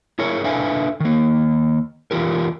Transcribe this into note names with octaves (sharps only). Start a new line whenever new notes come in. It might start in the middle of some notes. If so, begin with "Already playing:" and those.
E4 G#4 A#4 C#5
D4 A4 B4 E5 F5 G#5
D#3 A#3
E3 F4 G4 A#4